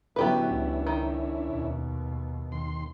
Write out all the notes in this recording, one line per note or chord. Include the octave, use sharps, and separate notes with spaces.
D3 F#3 B3 C#4 D4 E4 G4 B4
C#2
D#3
D#2 B2
D#2 C6